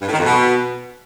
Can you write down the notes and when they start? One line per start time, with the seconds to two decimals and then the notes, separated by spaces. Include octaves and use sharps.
0.02 G2
0.07 A2
0.13 D#3
0.19 F2
0.25 B2